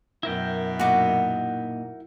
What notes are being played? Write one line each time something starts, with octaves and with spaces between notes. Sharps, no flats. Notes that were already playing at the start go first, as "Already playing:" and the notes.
F#2 B2 B3 E4 A#4 G5
A#2 D#4 F#4 D6